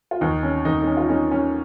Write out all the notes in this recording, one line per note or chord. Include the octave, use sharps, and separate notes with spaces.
F4
D#2 D#4
C#4
D#2 D#4
D#4
C#4
F4
C#4 D#4
C#4